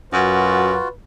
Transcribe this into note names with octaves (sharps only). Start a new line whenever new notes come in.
F#2 F4 F#4 B4